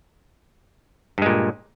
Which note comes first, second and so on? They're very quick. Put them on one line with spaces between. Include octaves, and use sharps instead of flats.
G2 G#3 A#2